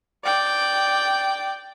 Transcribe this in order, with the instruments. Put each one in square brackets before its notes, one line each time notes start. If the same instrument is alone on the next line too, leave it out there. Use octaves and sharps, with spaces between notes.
[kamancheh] D5 G5